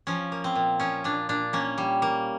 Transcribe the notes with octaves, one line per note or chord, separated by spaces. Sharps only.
F3 C#4
A#3
C4
A#2
F3 C#4
A#2 D4
A#2 D4
A#3 C#4
G3
A#3